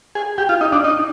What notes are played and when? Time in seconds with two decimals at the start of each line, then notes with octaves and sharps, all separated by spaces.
0.15 G#4
0.38 G4
0.49 F4
0.61 D#4
0.72 D4
0.84 D#4